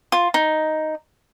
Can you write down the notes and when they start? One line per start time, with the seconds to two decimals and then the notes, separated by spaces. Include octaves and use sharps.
0.12 F4
0.34 D#4